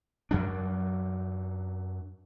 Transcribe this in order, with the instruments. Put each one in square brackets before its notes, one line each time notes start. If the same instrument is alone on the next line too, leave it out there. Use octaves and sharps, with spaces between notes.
[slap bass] F#2 F#3 D4